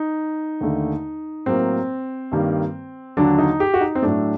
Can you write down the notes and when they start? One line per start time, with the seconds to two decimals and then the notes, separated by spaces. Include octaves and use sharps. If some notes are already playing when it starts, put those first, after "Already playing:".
Already playing: D#4
0.61 D#2 D3 A3
1.46 A2 F#3 A#3 C4
2.32 G2 D#3 G3 A#3
3.17 D#2 D3 F#3 D4
3.38 D#4
3.60 G4
3.74 F#4
3.81 D#4
3.95 C4
4.02 A2 F#3 A3 D4